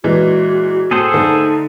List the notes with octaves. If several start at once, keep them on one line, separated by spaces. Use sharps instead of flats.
A#2 E3 G#3 F#4
A2 G#4 A4 C5
D3 A3 D#4